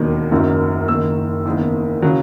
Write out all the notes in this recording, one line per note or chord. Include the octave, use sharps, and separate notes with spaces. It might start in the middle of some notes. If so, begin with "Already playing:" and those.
Already playing: E1 D#2 D#3 F#3
F#1 F#2 D#3 F#3
F#1 F#2 D#3 E6
F#1 E2 D#3
C#3 F#3